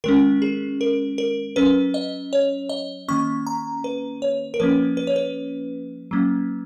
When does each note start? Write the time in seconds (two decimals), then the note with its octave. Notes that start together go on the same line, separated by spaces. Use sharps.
0.04 D#3 G#3 C#4 A#4
0.42 G#4
0.81 A#4
1.18 A#4
1.56 F#3 C#4 B4
1.94 D#5
2.33 C#5
2.69 D#5
3.08 D#3 A#3 C#4 C#6
3.47 A#5
3.84 B4
4.22 C#5
4.54 A#4
4.60 F3 A#3 C#4 B4
4.97 B4
5.07 C#5
5.16 B4
6.11 F#3 A#3 C#4